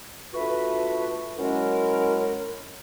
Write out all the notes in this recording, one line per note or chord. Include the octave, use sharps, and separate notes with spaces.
A3 D4 F4 F#4 B4
F#3 G#3 C#4 E4 A#4